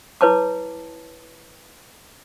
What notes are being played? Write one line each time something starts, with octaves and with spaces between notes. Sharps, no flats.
E4 B4 C#5 A5 D6